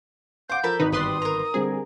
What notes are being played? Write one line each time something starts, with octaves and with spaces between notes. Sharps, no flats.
C5 F5 F#5 D6 G6
F3 A4 A#4 B5
G#1 D#4 B4
G1 G4 B4 D5 C6 D#6
A#4 A#5
D3 G3 C4 G#4